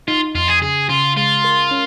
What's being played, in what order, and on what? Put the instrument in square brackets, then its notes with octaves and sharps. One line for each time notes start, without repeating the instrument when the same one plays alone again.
[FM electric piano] D#4 [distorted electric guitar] F4
[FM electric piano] F2 [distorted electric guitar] F4
[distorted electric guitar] G#4
[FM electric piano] C#3 [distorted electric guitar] G#4
[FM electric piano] C#3 [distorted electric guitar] F4
[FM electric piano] G#3 [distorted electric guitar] F4
[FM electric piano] A#4
C#4